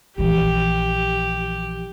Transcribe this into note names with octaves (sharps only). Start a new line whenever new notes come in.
A#1 E3 G4